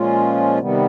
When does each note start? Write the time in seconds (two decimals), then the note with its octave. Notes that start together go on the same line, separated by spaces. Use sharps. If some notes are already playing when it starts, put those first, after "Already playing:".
Already playing: A#2 F3 G#3 C#4 F4
0.59 C3 D#3 G3 B3